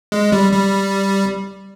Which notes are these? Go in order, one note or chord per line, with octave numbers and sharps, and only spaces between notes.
G#3
G3
G3